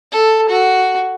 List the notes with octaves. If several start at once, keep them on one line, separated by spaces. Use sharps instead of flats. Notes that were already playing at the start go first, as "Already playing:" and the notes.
A4
F#4